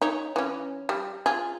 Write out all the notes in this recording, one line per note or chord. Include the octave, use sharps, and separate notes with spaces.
D#4 C#5
E3 C#4
G3
F4 G#4